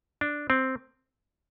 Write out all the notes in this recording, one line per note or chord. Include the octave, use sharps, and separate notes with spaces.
D4
C4